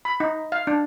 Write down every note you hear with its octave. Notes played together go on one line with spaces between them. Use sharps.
B5
D#4
F5
D4